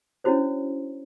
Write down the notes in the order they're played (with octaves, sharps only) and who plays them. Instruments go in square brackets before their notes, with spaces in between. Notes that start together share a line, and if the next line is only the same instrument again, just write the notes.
[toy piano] C#4 D4 E4 F#4 C5 C#5